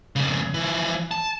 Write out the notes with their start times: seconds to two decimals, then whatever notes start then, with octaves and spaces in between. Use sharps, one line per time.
0.16 F2 C#3
0.54 E3 F3
1.11 A5